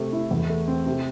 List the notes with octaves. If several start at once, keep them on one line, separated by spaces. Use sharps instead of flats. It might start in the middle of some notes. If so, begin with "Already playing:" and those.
Already playing: C3 A3
E4
E2
A3
C4
C3